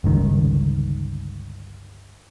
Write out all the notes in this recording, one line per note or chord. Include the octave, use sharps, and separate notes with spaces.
G1 C#2 D#3